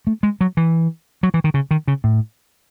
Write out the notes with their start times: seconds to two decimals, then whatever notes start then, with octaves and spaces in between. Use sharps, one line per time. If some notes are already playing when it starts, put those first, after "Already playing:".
0.07 A3
0.23 G#3
0.41 F#3
0.57 E3
1.23 F#3
1.34 E3
1.44 D#3
1.54 C#3
1.71 D#3
1.88 C#3
2.04 A2